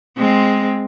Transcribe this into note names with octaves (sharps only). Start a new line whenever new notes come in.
G#3 C4